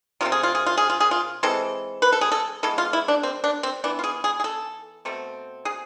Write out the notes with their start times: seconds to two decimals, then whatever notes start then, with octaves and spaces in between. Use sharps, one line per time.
0.21 C3 F3 A3 C4 F4
0.32 G#4
0.43 F4
0.55 G#4
0.66 F4
0.77 G#4
0.90 F4
1.00 G#4
1.11 F4
1.43 E3 G#3 C4 A4
2.02 B4
2.12 A4
2.21 G#4
2.32 A4
2.63 E3 G#3 B3 A4
2.78 F4
2.93 E4
3.08 D4
3.23 C4
3.44 D4
3.63 C4
3.84 E3 B3 D4
3.99 F4
4.04 G#4
4.24 G#4
4.40 G#4
4.44 A4
5.05 B2 A3 C4
5.65 G#4